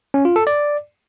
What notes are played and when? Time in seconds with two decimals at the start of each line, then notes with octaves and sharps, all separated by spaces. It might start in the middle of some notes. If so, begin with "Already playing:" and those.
0.14 C#4
0.25 F4
0.36 A4
0.47 D5